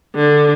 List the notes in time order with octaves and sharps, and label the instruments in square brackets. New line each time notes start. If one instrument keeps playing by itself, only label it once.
[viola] D3